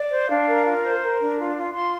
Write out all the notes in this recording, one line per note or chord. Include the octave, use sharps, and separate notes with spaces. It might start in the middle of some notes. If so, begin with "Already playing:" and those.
Already playing: D5
C5
D4 F5
A#4
F4
C5
A#4
D4
F4
F4
F4 C6